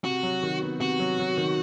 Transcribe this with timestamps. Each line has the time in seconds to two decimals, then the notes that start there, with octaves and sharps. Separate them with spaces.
0.04 C3 F#4
0.23 F#3
0.43 D#3
0.62 B3
0.80 C3 F#4
0.99 F#3
1.19 F#3
1.37 D#3